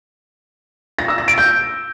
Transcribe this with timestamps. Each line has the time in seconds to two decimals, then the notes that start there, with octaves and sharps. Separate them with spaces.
0.99 A#6
1.08 E6
1.18 A#6
1.28 D7
1.38 G6